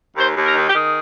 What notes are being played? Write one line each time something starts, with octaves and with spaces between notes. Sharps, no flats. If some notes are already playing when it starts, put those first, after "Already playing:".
D#2 C5
D#2
A#4
D#3
G4
D#3 G#4